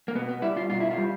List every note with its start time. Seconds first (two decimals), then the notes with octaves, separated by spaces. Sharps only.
0.08 A#3
0.15 B2 B3
0.29 B3
0.42 G3 E4
0.57 F4
0.70 B2 F4
0.80 E4
0.91 F4
0.98 G3